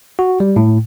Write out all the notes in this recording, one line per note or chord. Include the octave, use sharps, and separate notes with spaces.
F#4
G3
A2